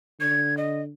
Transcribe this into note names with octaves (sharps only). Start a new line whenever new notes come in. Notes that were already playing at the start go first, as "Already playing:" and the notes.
D3 G#6
D#5